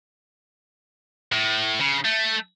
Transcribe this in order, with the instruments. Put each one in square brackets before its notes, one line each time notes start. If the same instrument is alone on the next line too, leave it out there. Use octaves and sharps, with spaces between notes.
[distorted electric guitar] A2
C#3
A3